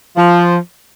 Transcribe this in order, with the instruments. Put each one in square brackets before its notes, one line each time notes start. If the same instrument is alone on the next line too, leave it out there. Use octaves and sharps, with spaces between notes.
[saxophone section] F3